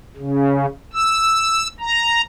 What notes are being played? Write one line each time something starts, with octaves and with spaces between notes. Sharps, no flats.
C#3
E6
A#5